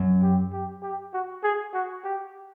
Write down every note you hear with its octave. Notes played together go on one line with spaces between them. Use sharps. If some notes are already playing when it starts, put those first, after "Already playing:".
Already playing: F#2
G4
G4
G4
F#4
G#4
F#4
G4